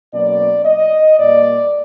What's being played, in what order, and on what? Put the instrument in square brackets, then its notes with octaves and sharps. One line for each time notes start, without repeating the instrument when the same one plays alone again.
[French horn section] B2 F#3 A#3 C#4 D5
D#5
A#2 G3 A#3 D5